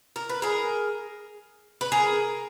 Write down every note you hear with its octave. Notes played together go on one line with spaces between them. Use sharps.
A#4
B4
G#4 A#4
B4
G#4 A#4